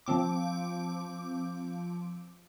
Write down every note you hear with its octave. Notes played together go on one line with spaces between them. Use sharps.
F3 C4 D6